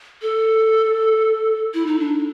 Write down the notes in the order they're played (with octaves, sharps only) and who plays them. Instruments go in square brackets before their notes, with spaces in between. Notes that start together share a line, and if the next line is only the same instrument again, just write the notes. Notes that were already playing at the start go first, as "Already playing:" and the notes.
[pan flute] A4
E4
D#4
D4